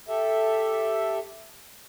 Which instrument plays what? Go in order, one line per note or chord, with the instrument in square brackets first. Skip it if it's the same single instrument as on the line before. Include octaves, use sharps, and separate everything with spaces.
[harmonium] G4 A4 E5